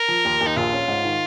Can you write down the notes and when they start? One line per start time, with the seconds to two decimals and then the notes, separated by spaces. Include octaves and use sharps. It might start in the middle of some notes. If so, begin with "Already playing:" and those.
Already playing: A#4
0.08 F3
0.25 D#2
0.41 D#2
0.47 D#4
0.57 A#1 F4
0.73 C#4
0.88 G#2
1.05 D#3